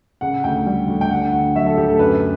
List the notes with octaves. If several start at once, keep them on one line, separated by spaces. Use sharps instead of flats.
C#3 F#5
D2 G5
G3
D2
G5
D3 F#5
D2 F#5
F#3 E5
A4
D2 G4
A4
F#2 B4